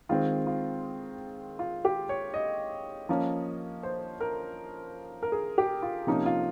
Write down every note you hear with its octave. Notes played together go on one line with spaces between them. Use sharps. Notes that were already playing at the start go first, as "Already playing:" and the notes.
D#3 G#3 C4 F4
F4
F4
G4
C#5
D#5
F3 A#3 C#4
C5
A#4
A#4
G#4
G4
F4
C3 F3 A#3 C#4 D#4
F4